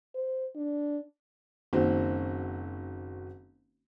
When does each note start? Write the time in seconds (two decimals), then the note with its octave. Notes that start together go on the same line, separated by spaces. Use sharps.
0.15 C5
0.56 D4
1.73 F#1 D#3 C4 F#4